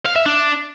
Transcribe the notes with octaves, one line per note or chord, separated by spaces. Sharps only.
F5
E5
D4